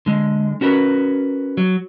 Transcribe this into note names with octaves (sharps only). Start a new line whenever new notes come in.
D3 G#3
C#4 F#4 A#4 B4
F#3